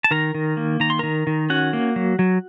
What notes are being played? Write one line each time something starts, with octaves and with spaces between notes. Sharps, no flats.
A5
D#3 A#4 A#5
D#3
A#3
D#3 A#5
C6
D#3 A#4 A#5
D#3
C#4 F#4 F#5
A#3
F#3
F#3